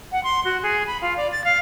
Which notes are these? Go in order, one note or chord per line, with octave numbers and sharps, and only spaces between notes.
F#5
C6
F#4
G#4
B5
F4
D5
A6
F5